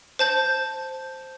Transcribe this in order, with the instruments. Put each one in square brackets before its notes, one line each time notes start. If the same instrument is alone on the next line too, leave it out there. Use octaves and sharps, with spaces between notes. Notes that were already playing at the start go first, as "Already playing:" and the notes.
[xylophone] C5 A5 G6